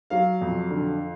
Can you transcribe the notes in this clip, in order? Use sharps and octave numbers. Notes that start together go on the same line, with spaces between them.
F#3 F5
F2
D3